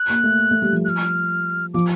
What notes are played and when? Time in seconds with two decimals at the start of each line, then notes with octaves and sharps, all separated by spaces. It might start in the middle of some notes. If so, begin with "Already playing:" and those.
Already playing: F#6
0.10 A#3
0.24 A3
0.51 A3
0.62 G3
0.73 F3
0.85 F#6
0.89 F6
1.74 F3 D6